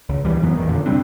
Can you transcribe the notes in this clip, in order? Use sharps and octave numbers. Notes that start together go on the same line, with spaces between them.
C#2
D#2 E3 G3
F#2 E3 F#3 B3
A1 E2 D#3
F#2 A#2 D3
C3 G3 C4 D4